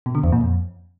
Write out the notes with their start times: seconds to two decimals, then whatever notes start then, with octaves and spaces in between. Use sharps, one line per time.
0.06 B2
0.15 D3
0.24 E2
0.32 A#2
0.41 F2